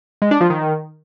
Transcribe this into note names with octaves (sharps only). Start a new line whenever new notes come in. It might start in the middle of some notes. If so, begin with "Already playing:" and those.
G#3
D4
F3
D#3